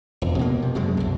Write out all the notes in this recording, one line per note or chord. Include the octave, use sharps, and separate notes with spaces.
E1 F2
B2 A#3
C3
F#2 B2 G#3
B1 F#2